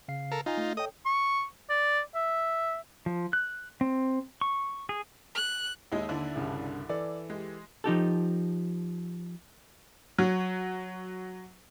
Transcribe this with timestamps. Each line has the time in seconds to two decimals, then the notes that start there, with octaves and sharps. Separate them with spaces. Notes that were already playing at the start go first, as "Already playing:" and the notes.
0.08 C#3 F5 C7
0.32 A4 A#4
0.46 D#4 F4 G#5 A#5 C6
0.57 A3
0.77 A4 C#5 D#5 G5 D#6
1.05 C#6
1.70 D5
2.15 E5
3.06 F3
3.33 F#6
3.81 C4
4.41 C#6
4.89 G#4
5.35 F#6
5.92 D#2 G#3 D#4 E4
6.09 D3 D4 E4
6.36 C2 G2 C#3
6.89 E3 A4 D5
7.30 G#3 G4
7.84 F3 D#4 G4 A4
10.18 F#3